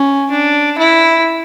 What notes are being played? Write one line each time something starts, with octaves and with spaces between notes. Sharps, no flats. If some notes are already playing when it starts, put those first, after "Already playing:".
Already playing: C#4
D4
E4